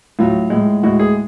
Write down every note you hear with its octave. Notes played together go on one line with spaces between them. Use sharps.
A2 F#3 F4
A2 G#3
A2 G#3 F#4
G#4